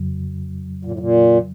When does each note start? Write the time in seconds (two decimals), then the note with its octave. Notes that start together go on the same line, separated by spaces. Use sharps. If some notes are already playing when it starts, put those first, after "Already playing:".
Already playing: F2 C#3 F#3
0.85 A#2
0.91 A2
0.99 A#2